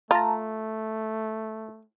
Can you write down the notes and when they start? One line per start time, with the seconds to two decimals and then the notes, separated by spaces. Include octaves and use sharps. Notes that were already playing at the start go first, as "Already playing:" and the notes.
0.11 A3 F4 A5 A#5